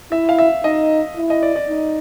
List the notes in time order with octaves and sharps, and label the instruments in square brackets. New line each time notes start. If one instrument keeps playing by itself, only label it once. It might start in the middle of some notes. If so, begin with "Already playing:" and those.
[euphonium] E4 [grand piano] E5
[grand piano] F5
E5
[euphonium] D#4 [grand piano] D#5
[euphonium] E4
[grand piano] D#5
D5
D5
[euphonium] D#4